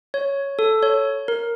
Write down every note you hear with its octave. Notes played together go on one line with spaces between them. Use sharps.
C#5
A4
C#5
A#4